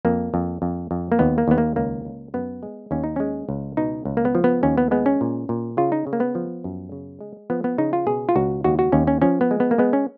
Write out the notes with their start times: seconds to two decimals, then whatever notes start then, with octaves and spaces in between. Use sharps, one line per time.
0.05 F2 A#3
0.34 F2
0.62 F2
0.91 F2
1.12 A#3
1.19 D#2 B3
1.38 A#3
1.48 D#2 B3
1.58 A#3
1.76 C#2 A#3
2.05 C#2
2.34 F#2 B3
2.63 G#3
2.91 D#2 C#4
3.04 D#4
3.16 G#3 C#4
3.49 C#2
3.77 B2 D#4
4.05 C#2
4.17 A#3
4.25 B3
4.35 F3
4.44 B3
4.63 D#2 C#4
4.77 B3
4.91 G#3 B3
5.06 C#4
5.21 A#2
5.49 A#2
5.77 C#3 F4
5.92 D#4
6.07 C#3
6.13 A#3
6.20 B3
6.35 F3
6.64 F#2
6.92 C#3
7.21 G#3
7.50 F3 B3
7.64 B3
7.78 C#3 D#4
7.93 F4
8.07 B2 G#4
8.29 F4
8.36 C#2 F#4
8.64 D#2 F#4
8.79 F#4
8.92 D#2 C#4
9.07 C#4
9.22 F3 C#4
9.41 B3
9.51 G#3
9.60 B3
9.71 A#3
9.78 G#3 B3
9.93 C#4